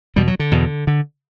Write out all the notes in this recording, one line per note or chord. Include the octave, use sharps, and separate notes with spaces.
E2 B2 G3
F#3
D3
E2 B2
D3